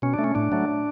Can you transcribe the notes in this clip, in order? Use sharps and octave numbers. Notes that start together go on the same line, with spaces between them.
B2 C#4
A3 D4
C#4
A2 D4
F#3 A3